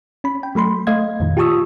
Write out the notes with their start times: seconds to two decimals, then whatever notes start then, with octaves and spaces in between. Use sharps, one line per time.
0.24 C#4 B5
0.43 G5
0.55 F#3 A3 B5 C6
0.87 A3 D#5 F5 G#6
1.20 F2 A#2 D#3
1.37 F4 G4 A5 C#6 D#6 E6